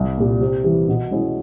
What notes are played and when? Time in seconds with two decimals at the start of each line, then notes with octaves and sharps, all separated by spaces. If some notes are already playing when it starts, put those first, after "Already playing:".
Already playing: C2
0.18 A#2 G3
0.41 C3
0.64 E3 G3
0.88 B2
1.11 G#3 C#4 E4